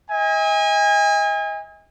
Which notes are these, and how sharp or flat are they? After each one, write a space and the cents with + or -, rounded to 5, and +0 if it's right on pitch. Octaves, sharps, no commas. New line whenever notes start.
D#5 +40 G#5 -30